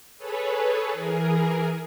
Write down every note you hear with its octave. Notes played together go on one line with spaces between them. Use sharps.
G#4 A4 B4 C#5
E3 G#4 A#4